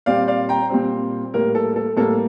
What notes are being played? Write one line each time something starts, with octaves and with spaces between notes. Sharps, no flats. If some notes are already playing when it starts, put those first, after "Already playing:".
A#2 G3 C4 D5 F5
D5 F5
G5 A#5
A#2 G3 C4
A2 G3 A#3 A#4
A4
A4
A2 G3 A#3 A4